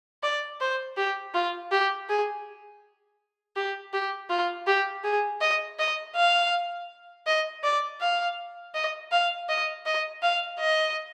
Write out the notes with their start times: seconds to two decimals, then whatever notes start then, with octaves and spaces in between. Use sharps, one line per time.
0.23 D5
0.61 C5
0.97 G4
1.34 F4
1.72 G4
2.09 G#4
3.56 G4
3.93 G4
4.30 F4
4.67 G4
5.04 G#4
5.41 D#5
5.79 D#5
6.16 F5
7.27 D#5
7.64 D5
8.01 F5
8.75 D#5
9.12 F5
9.49 D#5
9.86 D#5
10.23 F5
10.59 D#5